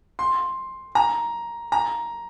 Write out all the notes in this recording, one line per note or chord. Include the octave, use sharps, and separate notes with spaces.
C6
A#5
A#5